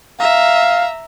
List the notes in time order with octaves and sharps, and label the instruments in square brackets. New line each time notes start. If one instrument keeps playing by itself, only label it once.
[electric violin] E5 A#5 [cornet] F5